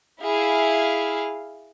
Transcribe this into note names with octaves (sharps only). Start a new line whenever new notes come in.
E4 G#4 F5